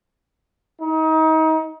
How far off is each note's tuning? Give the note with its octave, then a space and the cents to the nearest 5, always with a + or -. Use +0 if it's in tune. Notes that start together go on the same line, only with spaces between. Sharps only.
D#4 +30